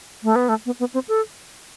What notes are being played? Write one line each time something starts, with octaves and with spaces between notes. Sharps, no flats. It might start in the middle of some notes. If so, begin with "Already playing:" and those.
A3
B3
A3
B3
B3
C4
A4